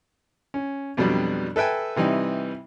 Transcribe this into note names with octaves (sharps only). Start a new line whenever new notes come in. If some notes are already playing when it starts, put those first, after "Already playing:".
C#4
F2 B2 F#3 G3 D4
A4 B4 E5 G5 G#5
C3 E3 G3 D#4